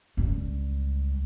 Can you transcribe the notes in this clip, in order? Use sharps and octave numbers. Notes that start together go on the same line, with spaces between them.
C#2 G3